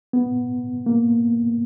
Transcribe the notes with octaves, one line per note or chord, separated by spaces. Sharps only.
B3
A#3